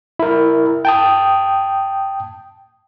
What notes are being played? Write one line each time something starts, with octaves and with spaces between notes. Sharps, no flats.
E4 A#4
G5 A5 D#6